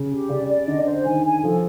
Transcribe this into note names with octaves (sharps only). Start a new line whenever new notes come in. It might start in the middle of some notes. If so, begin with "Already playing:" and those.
Already playing: C#3
G4
C#3 D5
D5
D3 D#5
C5
D#3 G#5
G#5
F3 A4